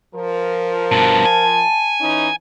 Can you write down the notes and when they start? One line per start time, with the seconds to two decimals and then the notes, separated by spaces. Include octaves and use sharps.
0.15 F3 A#4
0.92 G2 B2 A5
1.25 G#5
2.01 E3 C#4 D#4